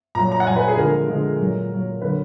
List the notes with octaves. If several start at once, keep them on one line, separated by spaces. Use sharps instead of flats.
A#2 F#3 A#5
A#5
F#5
A#2 F#3 G#5
B4
G#4
D3 F3 G#3 A#4
D3 F3 G#3
A#2 F#3
A#2 F#3
D3 F#3 B4